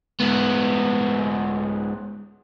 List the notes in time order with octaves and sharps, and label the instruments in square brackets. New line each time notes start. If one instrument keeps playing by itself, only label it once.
[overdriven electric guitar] G#2 B3